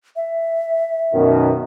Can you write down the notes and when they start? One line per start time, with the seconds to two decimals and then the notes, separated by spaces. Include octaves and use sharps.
0.16 E5
1.14 F#2 B2 D#3